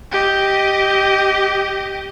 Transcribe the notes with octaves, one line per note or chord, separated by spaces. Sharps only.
G4 D#5